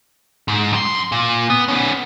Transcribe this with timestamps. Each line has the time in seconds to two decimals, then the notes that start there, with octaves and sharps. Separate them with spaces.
0.48 G#2
0.72 F#2 C6
1.12 A#2
1.50 B3
1.68 B3 C#4